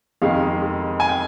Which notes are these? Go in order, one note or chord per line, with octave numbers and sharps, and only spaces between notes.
F2 C3 D#3 G#3 F5
G#5
G5